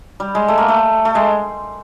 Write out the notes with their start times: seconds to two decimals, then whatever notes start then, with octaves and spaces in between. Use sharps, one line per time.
0.20 G3
0.35 G#3
0.48 A3
0.58 A#3
0.68 A3
1.05 A3
1.15 G#3